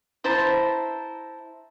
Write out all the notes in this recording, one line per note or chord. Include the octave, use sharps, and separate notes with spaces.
E4 C5 A5 A#5